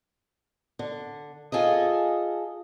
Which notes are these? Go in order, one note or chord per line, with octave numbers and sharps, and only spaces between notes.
D3
F4 G#4 A4 D#5